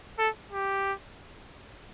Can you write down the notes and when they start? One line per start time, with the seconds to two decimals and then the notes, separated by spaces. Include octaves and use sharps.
0.19 A4
0.52 G4